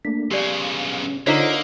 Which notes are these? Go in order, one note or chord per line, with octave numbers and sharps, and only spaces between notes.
A3 A#3 D4 B6
B1 C#3 G4 D5 F5
C#4
D3 A#3 D#4 F4 C5 C#5 B6